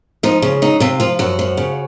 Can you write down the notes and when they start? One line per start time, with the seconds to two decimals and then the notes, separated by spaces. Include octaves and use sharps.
0.23 F3 D#4
0.42 C#3
0.62 F#3 D#4
0.80 C3 F4
1.00 F3 F4
1.19 F#2 F#4
1.39 F3
1.57 C#3